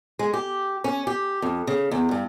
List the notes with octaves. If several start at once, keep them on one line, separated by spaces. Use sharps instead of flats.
G#3
G4
C#4
G4
F2
C#3
E2
G2